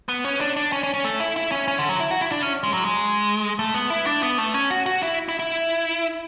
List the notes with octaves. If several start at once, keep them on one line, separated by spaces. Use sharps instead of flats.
B3
C#4
D4
D4
C#4
C#4
C#4
A3
E4
E4
C#4
C#4
D3
F#3
E4
F#4
E4
D4
C#4
G#3
F#3
G#3
A3
B3
E4
D4
B3
A3
C#4
F#4
F#4
E4
E4
E4